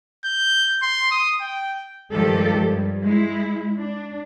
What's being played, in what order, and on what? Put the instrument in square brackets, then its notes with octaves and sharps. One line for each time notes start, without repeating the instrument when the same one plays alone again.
[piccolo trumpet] G6
C6
D#6
G5
[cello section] G2 D#3 F3 G#3 G4 A4
G2
G#3 E4
D4